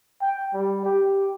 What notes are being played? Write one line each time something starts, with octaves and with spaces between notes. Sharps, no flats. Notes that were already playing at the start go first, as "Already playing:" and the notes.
G5
G3
G4